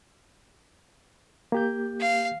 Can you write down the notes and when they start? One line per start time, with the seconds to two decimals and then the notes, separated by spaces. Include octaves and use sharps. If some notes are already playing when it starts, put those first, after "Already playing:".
1.52 A#3 G4 G6
2.01 F5